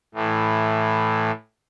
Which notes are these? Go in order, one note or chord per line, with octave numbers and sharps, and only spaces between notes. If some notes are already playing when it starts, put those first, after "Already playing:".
A2 E3